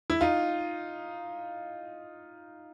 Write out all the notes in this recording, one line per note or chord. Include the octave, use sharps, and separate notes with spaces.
E4
D#4 F4